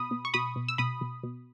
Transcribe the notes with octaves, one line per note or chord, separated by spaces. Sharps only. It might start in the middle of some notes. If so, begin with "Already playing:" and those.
Already playing: B2 B5 D#6
B2
C#6
B2 B5 D#6
B2
E6
B2 B5 D#6
B2
B2